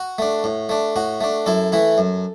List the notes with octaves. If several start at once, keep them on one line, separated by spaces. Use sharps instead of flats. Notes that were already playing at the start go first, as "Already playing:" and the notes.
Already playing: F#4
A3 D4
A2
A3 D4
A2 F#4
A3 D4
F#2 E4 A4
E3 A3 E4
F#2